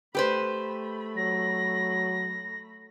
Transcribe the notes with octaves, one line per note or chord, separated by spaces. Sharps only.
A3 G4 B4 C5 B5
F#3 A#6